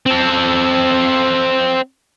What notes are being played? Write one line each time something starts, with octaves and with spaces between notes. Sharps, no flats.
C4 A4